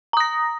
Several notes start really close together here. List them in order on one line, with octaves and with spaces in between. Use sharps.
A#5 D#6 A#6